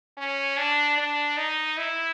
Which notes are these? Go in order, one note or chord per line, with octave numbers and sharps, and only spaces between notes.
C#4
D4
D4
D#4
E4